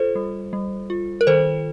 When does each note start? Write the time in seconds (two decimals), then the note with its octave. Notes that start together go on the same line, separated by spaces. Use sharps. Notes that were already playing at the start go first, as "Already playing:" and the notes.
Already playing: F4 A4 C5
0.15 G3
0.53 G3
0.90 F4
1.21 A#4
1.27 D#3 A4 C5